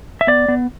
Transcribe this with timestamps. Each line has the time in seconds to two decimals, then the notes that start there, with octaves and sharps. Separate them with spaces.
0.21 E5
0.27 B3 D5
0.48 B3